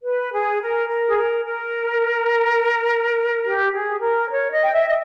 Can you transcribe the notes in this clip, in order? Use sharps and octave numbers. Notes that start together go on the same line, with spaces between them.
B4
G#4
A#4
A#4
G#4
A#4
A#4
G4
G#4
A#4
C#5
D#5
G5
E5
D#5